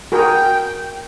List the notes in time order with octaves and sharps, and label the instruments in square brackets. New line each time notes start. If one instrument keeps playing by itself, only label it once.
[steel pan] F#4 G#4 A#4 [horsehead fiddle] G5